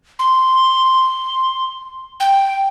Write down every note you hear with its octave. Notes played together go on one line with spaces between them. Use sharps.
C6
G5